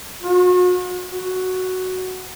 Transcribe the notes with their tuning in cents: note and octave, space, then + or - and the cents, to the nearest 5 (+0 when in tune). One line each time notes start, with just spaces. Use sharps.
F#4 -40
F#4 +5